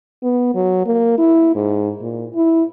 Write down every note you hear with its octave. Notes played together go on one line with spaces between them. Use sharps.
B3
F#3
A#3
E4
G#2
A#2
E4